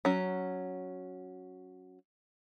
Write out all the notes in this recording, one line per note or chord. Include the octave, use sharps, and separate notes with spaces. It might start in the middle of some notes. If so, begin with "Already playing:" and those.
F#3 C#4